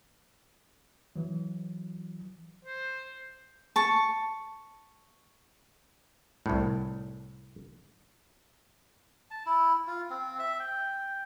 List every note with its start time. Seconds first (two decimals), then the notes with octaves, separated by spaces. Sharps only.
1.16 E3 F#3
2.64 C5
3.76 A5 C#6
6.46 C2 A2
9.31 A5
9.46 E4
9.87 F4
10.10 C4
10.39 E5
10.60 G5